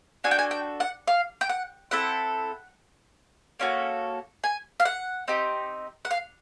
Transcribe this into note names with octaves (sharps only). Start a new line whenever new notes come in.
D4 F#4 A4 G#5
G5
G#5
G5
F#5
F5
G5
F#5
C4 E4 A4 F#5
A#3 C#4 F#4 A4
G#5
F5
F#5
C4 D#4 G4
F#5
F5